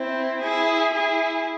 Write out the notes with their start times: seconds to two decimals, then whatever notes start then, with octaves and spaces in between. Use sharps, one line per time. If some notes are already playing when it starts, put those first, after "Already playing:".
Already playing: C4 E4
0.42 E4 G#4
0.95 E4 G#4